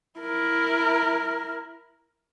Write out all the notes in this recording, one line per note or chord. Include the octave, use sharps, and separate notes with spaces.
E4 A#4